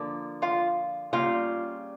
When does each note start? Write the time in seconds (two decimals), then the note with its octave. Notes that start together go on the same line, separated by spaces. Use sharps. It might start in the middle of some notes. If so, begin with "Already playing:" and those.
Already playing: D3 F3 A#3
0.42 F4 F5
1.13 C#3 G3 A#3 F4 F5